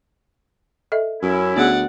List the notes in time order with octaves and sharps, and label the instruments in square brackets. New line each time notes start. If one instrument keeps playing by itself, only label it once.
[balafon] A4 D#5 E5
[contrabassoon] F#2 [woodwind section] C#4 E4
[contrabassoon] D2 [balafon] B3 F#4 G#4 [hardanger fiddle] D5 F#5